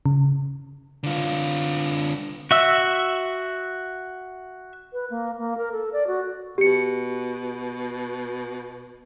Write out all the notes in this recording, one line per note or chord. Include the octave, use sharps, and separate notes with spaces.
C#3
D3 F4
F#4 E5 E6
B4
A#3
A#3
A#4
A4
D5
F#4
B2 G4 C#7